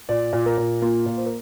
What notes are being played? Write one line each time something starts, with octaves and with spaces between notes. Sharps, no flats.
A#2 D5
A#2
A#4
A#2
A#3 F4
A#2
C5
A#4